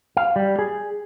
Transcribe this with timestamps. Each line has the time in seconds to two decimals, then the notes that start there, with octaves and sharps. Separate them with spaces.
0.17 F5
0.36 G3
0.59 G#4